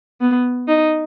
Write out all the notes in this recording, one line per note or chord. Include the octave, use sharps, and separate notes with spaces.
B3
D#4